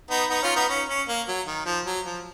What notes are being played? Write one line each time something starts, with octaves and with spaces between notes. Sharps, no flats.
B3 D#4
B3 D#4
C#4 F4
B3 D#4
C#4
C#4
A#3
F#3
D#3
F3
F#3
F3